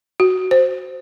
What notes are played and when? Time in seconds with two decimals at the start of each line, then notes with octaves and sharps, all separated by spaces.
0.20 F#4
0.51 C5